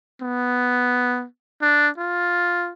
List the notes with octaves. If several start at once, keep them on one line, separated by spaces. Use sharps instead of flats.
B3
D4
F4